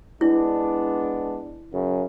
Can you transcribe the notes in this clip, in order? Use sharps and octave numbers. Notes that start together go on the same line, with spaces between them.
G#3 B3 D4 E4
F#2 C#3